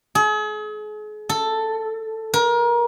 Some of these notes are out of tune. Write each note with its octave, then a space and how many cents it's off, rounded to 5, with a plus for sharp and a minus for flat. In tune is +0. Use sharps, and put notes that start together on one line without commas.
G#4 +40
A4 +5
A#4 +30